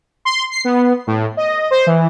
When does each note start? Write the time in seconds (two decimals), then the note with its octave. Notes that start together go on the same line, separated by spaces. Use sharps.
0.25 C6
0.51 C7
0.64 B3
1.07 A2
1.37 D#5
1.71 C5
1.86 E3